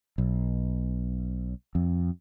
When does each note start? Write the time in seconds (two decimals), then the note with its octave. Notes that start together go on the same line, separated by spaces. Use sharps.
0.18 B1
1.75 F2